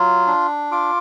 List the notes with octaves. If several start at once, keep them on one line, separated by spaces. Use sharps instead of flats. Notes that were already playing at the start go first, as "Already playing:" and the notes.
Already playing: F#3 F4
D4
F4 D6